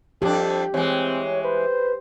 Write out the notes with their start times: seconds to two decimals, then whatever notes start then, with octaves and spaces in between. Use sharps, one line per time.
0.22 F2 D4 G4 A4
0.74 E3 G#3 C4 C#5
1.44 B4 C5